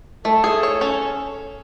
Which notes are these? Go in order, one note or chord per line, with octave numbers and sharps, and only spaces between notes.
A3 A4
G#4
C#5
C#4